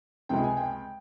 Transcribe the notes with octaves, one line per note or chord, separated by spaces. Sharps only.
C#2 C3 F3 G#3 G5
G#5
G5